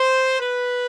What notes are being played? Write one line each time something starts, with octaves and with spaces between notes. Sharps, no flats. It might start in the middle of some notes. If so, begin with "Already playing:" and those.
Already playing: C5
B4